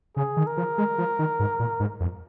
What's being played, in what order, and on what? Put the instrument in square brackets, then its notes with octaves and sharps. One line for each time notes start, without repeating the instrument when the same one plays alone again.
[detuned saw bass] C#3 [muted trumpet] G#4
[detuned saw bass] D#3
[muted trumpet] A#4
[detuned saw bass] F3
G#3
F3
D#3
G#2
A#2
G#2
F2